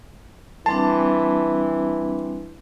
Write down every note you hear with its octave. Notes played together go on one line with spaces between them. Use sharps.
E3 G3 C4 D4 A5